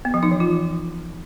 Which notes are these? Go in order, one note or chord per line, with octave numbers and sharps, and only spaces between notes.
B3
F3
D#4
E3
F4